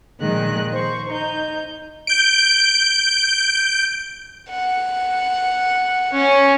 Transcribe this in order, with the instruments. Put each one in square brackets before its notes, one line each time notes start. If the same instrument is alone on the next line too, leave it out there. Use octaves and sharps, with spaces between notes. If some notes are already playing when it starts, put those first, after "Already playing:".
[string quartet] A#2 D#3 F3 G#3 D#5 F#6
C5 C#6
D#4 G6
[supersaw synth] G6 D7
[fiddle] F#5
C#4